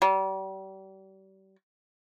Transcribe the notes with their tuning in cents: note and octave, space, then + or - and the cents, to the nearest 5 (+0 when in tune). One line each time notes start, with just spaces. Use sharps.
G3 -35